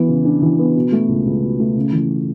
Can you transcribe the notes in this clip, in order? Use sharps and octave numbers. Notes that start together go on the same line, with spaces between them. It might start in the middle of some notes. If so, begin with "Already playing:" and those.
Already playing: E3 B3
C#3
D4
E3
B3
B2
A3
C#2
C#2
B2
A3
C#3
E3